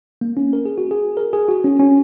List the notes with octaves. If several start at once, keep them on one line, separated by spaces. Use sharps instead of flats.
A#3
C#4
A#4
G#4
F#4
G#4
A#4
G#4
F#4
C#4
C#4